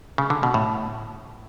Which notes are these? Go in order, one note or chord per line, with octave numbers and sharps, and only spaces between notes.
C#3
D3
B2
A2